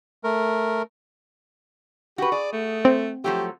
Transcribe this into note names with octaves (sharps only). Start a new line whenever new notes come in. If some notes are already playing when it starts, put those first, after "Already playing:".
A3 A#4
F#4 G4 B4
G#4 D5
A3
C4
F3 F#3 A3 G4